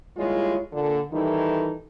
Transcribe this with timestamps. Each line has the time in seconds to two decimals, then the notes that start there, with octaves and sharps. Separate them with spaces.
0.17 D#2 G3 G#3 E4 F4 C#5
0.73 A#2 D3
1.12 D#3 E3 G3 D#4 E4 A4